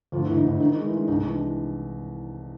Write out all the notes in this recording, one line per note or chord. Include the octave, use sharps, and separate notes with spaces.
D2 F3 F4
E3 E4
D2
D#4
D2 E3 E4
D#3 D#4
D#4
G#3
E3 E4
G#3 D#4
C2 D#4
D#4
E3
D4